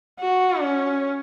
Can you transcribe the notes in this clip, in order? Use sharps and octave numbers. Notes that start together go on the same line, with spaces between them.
F#4
C#4